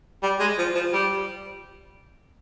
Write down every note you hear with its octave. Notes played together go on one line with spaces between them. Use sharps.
G3
G#3
F3
F3
G3